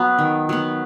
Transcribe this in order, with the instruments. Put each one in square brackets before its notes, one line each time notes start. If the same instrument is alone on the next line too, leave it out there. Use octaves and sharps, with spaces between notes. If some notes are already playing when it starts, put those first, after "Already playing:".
Already playing: [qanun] F#3 B3
D#3
F#3 B3